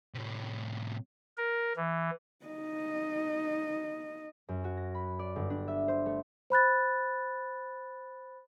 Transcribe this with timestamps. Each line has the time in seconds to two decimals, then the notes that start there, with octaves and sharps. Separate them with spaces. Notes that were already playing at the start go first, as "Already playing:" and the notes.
0.14 A2 C3
1.38 A#4
1.76 E3
2.45 D#4 D#5
4.49 F#2
4.64 F#4
4.77 A#6
4.95 B5
5.19 D5
5.36 G1
5.50 D4
5.68 E5
5.88 C5
6.06 A3
6.50 C5 B5 F#6 A6